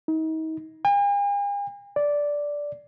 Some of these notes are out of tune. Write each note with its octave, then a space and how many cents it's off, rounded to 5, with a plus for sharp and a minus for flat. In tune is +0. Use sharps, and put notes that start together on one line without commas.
D#4 +40
G#5 -45
D5 -10